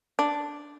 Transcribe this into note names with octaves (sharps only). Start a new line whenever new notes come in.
D4